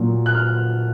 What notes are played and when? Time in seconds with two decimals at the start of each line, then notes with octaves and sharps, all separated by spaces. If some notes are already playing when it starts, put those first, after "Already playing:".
Already playing: A#2 F#3
0.26 F#6
0.35 F6